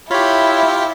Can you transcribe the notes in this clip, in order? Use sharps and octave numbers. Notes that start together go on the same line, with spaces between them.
E4 F4 G4 C#5 B5